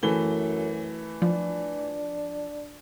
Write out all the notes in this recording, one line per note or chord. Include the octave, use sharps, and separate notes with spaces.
F#2 E3 A3 G7
F3 D4